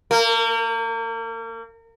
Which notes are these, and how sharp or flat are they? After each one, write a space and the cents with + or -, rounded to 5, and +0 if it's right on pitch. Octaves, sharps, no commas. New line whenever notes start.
A#3 -35